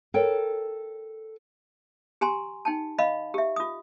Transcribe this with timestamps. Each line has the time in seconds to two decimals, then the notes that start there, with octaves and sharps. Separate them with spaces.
0.14 A4 A#4 C#5 G5
2.21 G4 G#5 A#5 C6
2.65 D#4 G5 A5
2.98 D#5 F5 B5
3.34 G4 E5
3.56 F4 D#6